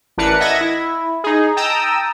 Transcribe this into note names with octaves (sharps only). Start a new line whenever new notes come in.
A1 E3 D4 A#4 B4 C#7
D#5 E5 F#5 A5 G#6 A#6
E4
D#4 G#4
G5 A5 A#5 D#6 E6